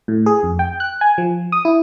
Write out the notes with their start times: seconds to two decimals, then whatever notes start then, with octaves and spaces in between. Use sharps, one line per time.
0.08 A2
0.26 G#4
0.43 F2
0.59 G5
0.80 F#6
1.01 G#5
1.18 F3
1.52 D#6
1.65 E4